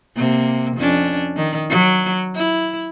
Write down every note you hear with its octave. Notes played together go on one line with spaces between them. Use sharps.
C3 A#3
F2 C#4 D4
D#3
F#3
E4